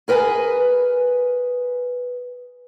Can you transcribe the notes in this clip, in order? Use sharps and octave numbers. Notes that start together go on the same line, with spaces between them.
G#4 A#4 B4 F#5 G#5